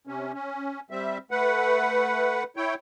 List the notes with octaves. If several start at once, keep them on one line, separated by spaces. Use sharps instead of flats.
C3 C#4
C#4
G3 C4 E5
A3 B4 F#5
E4 C#5 G5